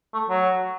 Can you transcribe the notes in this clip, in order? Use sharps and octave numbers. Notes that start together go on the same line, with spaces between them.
A3
F#3